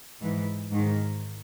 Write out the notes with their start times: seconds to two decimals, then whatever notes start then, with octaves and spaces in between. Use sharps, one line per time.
0.21 G#2 E3
0.71 G#2 D#3